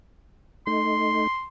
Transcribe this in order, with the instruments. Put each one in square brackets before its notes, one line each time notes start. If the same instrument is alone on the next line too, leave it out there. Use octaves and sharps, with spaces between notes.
[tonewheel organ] A3 D#4 [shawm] C6